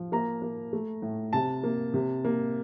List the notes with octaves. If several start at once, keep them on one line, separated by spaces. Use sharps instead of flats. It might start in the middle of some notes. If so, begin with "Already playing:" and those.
Already playing: F3
A#3 A#5
A#3
A3
A2
C3 A5
A#3
C3
A#3